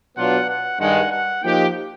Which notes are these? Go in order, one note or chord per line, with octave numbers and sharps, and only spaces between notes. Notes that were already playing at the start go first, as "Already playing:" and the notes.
B2 F#3 B3 D4 F4 F#5
F#5
G2 D#3 G#3 F#5
F#5
F3 A#3 D#4 G4 G5